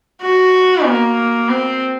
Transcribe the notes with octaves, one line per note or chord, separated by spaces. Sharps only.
F#4
A#3
C4